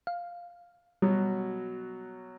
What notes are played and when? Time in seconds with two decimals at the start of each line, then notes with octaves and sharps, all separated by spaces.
0.07 F5
1.02 B2 F#3 G3